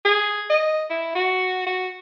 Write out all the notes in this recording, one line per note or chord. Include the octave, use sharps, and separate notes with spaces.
G#4
D#5
E4
F#4
F#4